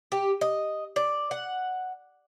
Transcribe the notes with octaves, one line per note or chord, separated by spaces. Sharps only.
G4
D#5
D5
F#5